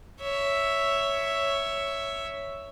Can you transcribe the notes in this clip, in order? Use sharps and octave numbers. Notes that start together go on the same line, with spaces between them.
C#5 E5